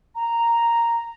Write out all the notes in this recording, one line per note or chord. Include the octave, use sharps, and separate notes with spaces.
A#5